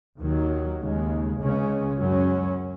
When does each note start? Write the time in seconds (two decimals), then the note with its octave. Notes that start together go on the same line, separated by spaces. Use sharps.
0.19 D#2 D#3 F#3
0.79 D#2 C#3 G#3
1.38 C#2 C#3 G#3 C#4
1.98 F#2 F#3 C#4